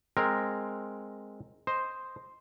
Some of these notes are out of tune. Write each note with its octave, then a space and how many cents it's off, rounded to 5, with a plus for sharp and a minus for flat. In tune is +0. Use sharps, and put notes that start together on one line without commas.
G#3 +0 C4 +5 A#4 +0
C5 +0 D#5 +0